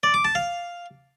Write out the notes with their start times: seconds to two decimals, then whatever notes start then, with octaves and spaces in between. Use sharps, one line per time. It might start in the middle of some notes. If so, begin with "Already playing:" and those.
0.03 D5
0.14 D6
0.25 A5
0.35 F5